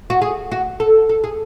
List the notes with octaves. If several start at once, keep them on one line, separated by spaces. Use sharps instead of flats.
F#4
G#4
F#4
A4
A4
G#4